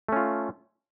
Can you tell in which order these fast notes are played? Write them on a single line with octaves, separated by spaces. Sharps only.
A3 C#4 F4